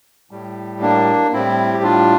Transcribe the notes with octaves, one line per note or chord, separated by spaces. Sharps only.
A2 G3
A#3 D4
A2 G3 C4 E4
G4
D4 F4